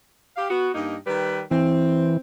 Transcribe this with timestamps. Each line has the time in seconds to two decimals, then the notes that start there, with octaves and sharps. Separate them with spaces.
0.36 G4 F5
0.49 B3 F#4
0.74 G2 A#3 D#4
1.07 D#3 G3 B4
1.51 E3 C4